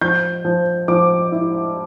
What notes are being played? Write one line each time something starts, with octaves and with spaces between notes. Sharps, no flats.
F3 G6
F3
F3 D6
E4